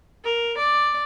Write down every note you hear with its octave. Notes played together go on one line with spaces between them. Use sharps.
A#4
D5